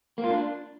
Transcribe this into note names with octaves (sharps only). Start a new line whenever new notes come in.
A#3
F4
D4